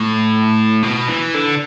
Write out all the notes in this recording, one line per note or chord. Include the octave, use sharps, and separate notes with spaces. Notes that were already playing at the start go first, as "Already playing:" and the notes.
Already playing: A2
B2
E3
D3